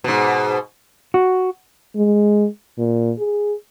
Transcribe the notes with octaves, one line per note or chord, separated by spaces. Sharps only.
G#2 B2
F#4
G#3
A#2
G#4